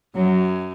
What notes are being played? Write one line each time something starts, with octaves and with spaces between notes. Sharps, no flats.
F#2 F#3